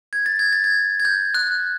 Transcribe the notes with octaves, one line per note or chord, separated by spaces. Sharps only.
G#6
A6
G#6
A6
G#6
G#6
G6
F#6